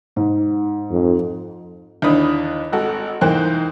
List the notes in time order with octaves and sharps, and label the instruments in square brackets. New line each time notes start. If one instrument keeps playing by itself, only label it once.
[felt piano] G#2
[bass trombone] F2
[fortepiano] D#2 D3 E3 D4 B5 D#6
G#1 F#4 A4
E2 G#2 A#3 C5 G5 F#6